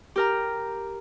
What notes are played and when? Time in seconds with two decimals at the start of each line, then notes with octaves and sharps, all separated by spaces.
0.16 G4 A#4 A#5